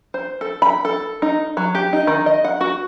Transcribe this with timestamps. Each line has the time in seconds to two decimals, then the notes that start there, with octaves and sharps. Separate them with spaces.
0.14 C5
0.41 A4
0.62 B5
0.85 A4
1.22 D#4
1.57 F#3
1.75 G4
1.93 D#4
2.07 D#3
2.26 D#5
2.45 F#5
2.61 F#4